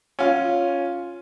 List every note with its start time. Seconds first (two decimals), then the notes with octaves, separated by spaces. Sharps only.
0.19 C#4 F4